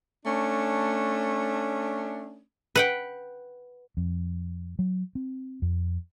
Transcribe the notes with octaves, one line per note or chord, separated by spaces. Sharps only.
A3 C#4 D4
B4 F#5 G5
F2
F#3
C4
F2